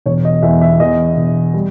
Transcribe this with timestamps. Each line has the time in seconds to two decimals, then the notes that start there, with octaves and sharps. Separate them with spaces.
0.06 E1 C#5
0.25 D#5
0.42 E2 E5
0.61 E5
0.80 E2 D#5
1.17 E1
1.54 G3